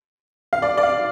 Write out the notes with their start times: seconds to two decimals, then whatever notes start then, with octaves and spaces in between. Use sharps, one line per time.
0.53 F5
0.62 D5
0.77 D5
0.83 F5